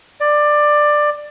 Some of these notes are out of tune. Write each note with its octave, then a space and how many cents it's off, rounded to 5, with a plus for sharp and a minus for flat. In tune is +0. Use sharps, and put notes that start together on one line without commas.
D5 +15